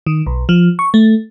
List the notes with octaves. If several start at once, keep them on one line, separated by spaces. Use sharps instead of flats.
D#3
B1
F3
C#6
A3